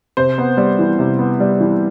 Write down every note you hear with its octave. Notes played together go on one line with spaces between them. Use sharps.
C3 C5
B3
G3
E3
C3
B3
G3
E3